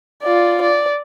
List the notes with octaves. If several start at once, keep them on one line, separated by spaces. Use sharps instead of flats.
F4 D5
D5